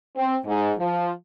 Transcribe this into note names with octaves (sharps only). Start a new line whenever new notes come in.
C4
G#2
F3